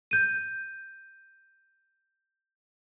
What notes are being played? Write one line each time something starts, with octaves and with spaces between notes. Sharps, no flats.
G6 D#7